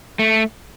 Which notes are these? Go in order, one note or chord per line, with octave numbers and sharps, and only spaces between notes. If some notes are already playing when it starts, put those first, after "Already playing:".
A3